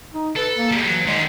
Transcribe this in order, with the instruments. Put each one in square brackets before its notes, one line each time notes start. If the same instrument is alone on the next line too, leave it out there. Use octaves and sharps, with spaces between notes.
[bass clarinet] D#4
[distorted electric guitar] A4 [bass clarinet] B4
[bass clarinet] A#3
[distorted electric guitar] G3 G#3
[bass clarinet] E3 [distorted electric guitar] F#3
[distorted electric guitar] D#3 D5 [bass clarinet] G#3